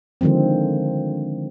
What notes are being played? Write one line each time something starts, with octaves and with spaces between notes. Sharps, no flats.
D3 D#3 F3 G#3 C4